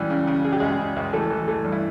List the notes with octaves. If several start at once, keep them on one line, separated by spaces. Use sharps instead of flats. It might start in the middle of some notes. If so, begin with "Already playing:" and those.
Already playing: C#2 E3 G3 G4
C#3
C#3
C#3 G#4
G4
C#2 G#3 G#4
C#3
C#2
E3 A3 A4
E3
E3 A3 A4
G2
E4